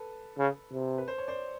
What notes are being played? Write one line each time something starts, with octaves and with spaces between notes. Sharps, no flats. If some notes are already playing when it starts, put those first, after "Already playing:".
Already playing: A4 B4
C#3
C3
B4
C5
C#5
C5 D5